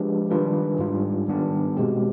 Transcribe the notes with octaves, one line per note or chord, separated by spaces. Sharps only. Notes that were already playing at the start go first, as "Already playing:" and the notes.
Already playing: F3 G#3 D4 G4 B4
D#3 G3 D4 F4 B4
G#2 G3 D4 F4
D#3 G3 B3 D4
B2 G#3 C4 G4